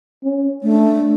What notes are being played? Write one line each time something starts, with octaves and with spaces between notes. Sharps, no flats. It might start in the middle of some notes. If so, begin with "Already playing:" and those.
C#4
A3 D4